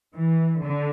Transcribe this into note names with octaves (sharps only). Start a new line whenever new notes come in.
E3
D3